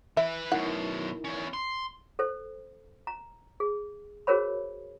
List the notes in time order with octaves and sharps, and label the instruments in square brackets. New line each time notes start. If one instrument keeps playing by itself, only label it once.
[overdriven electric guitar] E3 B4 [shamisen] E5
[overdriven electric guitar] F#2 B2 [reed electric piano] D#4 E4 A#4 [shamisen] F#5
[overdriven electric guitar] E2 C#4
C6
[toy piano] A4 C5
A#5
G#4
F#4 G#4 A#4 C5 C#5 B5